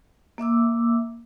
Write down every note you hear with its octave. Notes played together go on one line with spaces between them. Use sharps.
A#3 E5 D6 E6